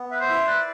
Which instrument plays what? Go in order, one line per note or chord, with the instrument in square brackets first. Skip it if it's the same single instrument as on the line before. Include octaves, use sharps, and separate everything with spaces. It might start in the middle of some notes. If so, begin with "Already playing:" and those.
Already playing: [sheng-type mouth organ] B3
[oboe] B4 [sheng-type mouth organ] E5
[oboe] C5
[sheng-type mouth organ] E4
[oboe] B4 [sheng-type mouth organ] D5